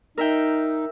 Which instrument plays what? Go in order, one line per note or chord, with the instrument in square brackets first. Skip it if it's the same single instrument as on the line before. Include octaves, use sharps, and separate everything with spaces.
[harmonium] D#4 [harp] A#4 E5 G5